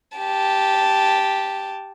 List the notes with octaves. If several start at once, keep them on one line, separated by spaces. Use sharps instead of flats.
G4 A5